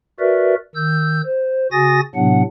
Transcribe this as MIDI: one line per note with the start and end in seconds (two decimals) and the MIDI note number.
0.20 0.55 66
0.20 0.55 70
0.20 0.55 71
0.20 0.55 74
0.20 0.55 76
0.75 1.21 51
0.75 1.21 88
0.75 1.21 91
1.25 1.67 72
1.72 2.00 49
1.72 2.00 66
1.72 2.00 80
1.72 2.00 87
1.72 2.00 93
1.72 2.00 94
2.15 2.42 45
2.15 2.42 48
2.15 2.42 54
2.15 2.42 59
2.15 2.42 62
2.15 2.42 78